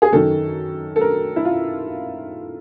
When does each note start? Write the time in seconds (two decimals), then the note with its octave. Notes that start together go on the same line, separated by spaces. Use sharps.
0.02 G#4
0.12 F#2 D#3 F#3 A4
0.96 A4
1.01 A#4
1.36 E4
1.45 F4